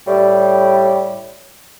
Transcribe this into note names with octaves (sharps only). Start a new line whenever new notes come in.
A2 G3